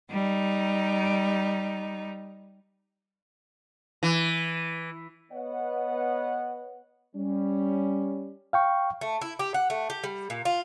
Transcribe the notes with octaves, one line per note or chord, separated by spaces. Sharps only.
G3 D#4
E3
B3 C#5 D#5 F#5
G3 C#4
F5 G5 C#6
A3
E4
G4
F#5
A3
G4
G3
A#2
F4